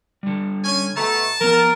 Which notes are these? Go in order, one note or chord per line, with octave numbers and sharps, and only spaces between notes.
D3 G3
C#4 G#5
B2 A3 A5 A#5
F3 B3 A#4